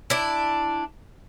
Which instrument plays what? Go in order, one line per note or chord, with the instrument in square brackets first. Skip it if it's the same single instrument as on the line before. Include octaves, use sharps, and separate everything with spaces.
[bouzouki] D4 E4